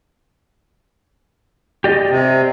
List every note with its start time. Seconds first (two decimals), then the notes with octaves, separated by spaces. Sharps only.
1.84 G4 D5 D#5
2.10 C3